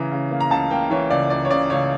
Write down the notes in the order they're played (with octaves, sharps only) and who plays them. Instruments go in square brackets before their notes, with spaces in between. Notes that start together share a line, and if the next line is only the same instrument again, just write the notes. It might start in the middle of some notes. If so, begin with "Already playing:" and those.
Already playing: [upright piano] C#3 E3 A#5
C#3
A#3
A#5
C#2 A5
A#3 G5
E3 C#5
C#2 D5
C#2 D5
C#5
C#3 D5
C#2 C#5